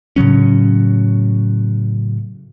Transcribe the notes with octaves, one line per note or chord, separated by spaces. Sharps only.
A2 C#3 F#3 C#4